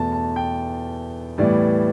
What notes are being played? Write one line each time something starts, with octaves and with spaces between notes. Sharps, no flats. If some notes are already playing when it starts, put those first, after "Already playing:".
Already playing: E2 B2 A3 A5
A5
G5
A2 E3 G3 B3 D5